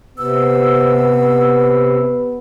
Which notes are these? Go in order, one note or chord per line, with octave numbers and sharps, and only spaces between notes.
C3 B3 E6